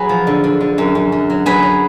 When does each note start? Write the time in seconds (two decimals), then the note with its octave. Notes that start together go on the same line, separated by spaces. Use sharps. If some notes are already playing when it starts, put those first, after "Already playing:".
Already playing: F#3 G#4 B4
0.09 F3
0.27 D3
0.44 D3
0.61 D3
0.78 F#2
0.95 F#2
1.12 F#2
1.30 F#3
1.46 F#3 G#4 B4
1.63 F#3